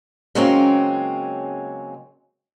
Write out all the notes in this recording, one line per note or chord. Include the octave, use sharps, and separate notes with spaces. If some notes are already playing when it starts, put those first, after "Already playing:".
C#3 F#3 G#3 A#3 C4 C#4